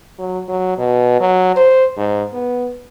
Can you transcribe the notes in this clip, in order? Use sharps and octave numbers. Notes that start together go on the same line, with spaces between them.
F#3
F#3
B2
F#3
C5
G#2
B3